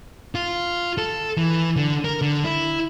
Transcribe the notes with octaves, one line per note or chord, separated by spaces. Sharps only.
F4
A4
E3
D3
A#4
D3
E4